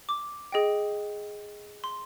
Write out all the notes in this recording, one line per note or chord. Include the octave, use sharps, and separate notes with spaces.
D6
G#4 D#5 G5
C6